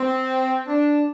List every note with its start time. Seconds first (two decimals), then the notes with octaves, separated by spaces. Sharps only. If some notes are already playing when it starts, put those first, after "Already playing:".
Already playing: C4
0.67 D4